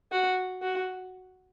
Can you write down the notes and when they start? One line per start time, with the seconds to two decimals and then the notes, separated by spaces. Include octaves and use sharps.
0.12 F#4
0.62 F#4